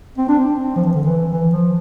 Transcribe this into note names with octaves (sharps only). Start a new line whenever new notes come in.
C4
D4
C4
F3
E3
D3
E3
E3
F3